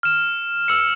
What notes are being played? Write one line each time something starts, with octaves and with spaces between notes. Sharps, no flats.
F6 E7
E6 C#7